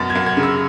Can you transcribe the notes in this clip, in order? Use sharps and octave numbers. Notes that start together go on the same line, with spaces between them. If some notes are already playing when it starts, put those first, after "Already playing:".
Already playing: F#2 B2 A6
G#6
F#2
G#6
C#3
E6